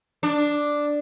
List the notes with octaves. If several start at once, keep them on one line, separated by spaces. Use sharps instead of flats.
D4